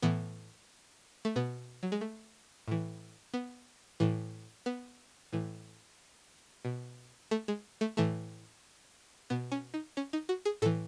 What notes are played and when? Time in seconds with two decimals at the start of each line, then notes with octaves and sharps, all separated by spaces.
0.02 A2 E3 B3
1.25 A3
1.36 B2 B3
1.83 F#3
1.92 G#3
2.01 A3
2.68 A2 E3
3.34 B3
4.00 A2 E3
4.66 B3
5.33 A2 E3
6.65 B2
7.31 A3
7.48 G#3
7.81 A3
7.97 A2 E3 A3
9.30 B2 B3
9.52 C#4
9.74 D#4
9.97 C#4
10.13 D#4
10.29 F#4
10.45 G#4
10.62 A2 A4
10.66 E3